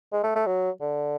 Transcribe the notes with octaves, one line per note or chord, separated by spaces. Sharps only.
G#3
A3
A3
F#3
D3